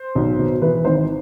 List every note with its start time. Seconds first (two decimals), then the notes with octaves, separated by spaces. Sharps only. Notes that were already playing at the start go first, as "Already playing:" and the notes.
Already playing: C5
0.15 B1
0.39 B2
0.62 E3 B4
0.85 G#1 C5